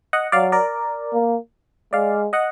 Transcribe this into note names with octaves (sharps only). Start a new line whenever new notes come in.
D#5 F#5
F#3 D5 F5
A#4 D5
A#3
G#3 D5 F5
D#5 F#5